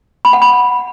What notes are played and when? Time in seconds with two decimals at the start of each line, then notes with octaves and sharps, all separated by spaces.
0.25 B5
0.33 F#5
0.42 B5